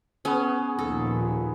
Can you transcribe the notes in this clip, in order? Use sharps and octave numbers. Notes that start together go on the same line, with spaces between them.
B3 C#4 G#4 G#5
A#1 D#2 A#2 A4